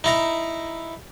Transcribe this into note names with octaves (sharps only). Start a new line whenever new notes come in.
D#4 E4 A#5